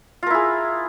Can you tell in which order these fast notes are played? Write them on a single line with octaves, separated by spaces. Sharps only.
F4 A#4 E4 G#4